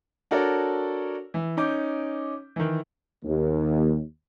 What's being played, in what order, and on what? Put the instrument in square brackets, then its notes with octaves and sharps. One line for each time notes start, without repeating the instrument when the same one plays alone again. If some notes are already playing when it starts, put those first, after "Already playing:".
[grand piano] D4 F#4 A4 A#4 C#5 D5
E3
C#4 D#4 D6 G6
D#3 E3
[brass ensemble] D#2